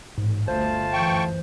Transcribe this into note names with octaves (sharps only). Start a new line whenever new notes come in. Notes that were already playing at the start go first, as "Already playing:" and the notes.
A1 G#2
G1 D2 A3 F4 C5 A5
F#2 E3 G5 C#6